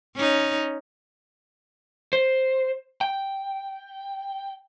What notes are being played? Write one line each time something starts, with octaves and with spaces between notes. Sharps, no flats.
C#4 D#4
C5
G5